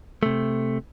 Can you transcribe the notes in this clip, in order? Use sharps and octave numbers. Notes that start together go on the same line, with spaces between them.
C3 A3